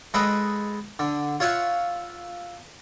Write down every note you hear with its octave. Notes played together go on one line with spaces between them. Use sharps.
G#3 A4 B4 D#5 F#5 G5
D3
F4 C#5 E5 F#5